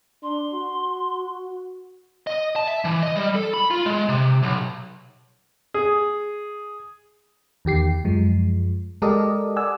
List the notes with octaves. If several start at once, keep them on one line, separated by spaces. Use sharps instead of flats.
D4 C6
F#4
D#5
A5
E5
E3
D#5
G3
A4
B5
F4
G#3
C3
B1
G#4
E2 D#3 G4 C7
F#2 F3 G#3
G#3 G4 A4 A#4 D5 D#5
D5 F#5 G#5 E6